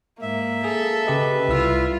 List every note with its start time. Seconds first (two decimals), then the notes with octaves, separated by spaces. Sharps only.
0.22 G#2 A#3 E5
0.64 G#4 A4
1.07 C#3 G4 B4 D#5
1.49 C2 G3 E4 F4 E6